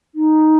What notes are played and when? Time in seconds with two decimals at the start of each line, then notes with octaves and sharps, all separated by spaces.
0.15 D#4